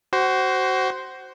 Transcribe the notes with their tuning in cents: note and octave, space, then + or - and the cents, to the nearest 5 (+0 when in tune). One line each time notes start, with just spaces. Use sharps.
F#4 +25 C5 +0